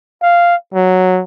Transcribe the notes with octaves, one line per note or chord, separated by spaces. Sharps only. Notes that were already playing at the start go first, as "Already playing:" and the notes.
F5
F#3